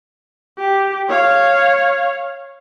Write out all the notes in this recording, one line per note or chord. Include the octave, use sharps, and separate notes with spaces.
G4
C#5 F5